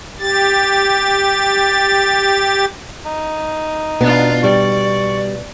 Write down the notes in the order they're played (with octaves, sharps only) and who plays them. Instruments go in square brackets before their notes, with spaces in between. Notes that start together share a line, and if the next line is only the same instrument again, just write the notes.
[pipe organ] G4 A6
[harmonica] D#4
[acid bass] B2 [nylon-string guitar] B3 [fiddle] D4 F4
[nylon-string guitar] G3 [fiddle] D5 [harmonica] C#6